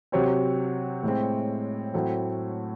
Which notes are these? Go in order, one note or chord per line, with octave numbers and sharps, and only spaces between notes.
C3 F#3 C4 C#5
A2 G#3 C4
A2 F#3 A3 C4